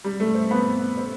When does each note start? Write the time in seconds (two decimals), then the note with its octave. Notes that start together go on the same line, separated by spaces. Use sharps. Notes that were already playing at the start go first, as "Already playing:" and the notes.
0.04 G3
0.20 A3
0.35 C4
0.51 B3
0.97 C4